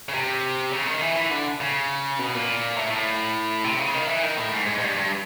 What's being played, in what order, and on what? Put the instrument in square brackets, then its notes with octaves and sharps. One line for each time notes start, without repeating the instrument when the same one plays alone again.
[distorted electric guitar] C#3
C3
C#3
D#3
E3
E3
D3
C#3
B2
A#2
A2
A2
C3
C#3
D#3
E3
D#3
A2
G#2
G#2
G#2
G2
G2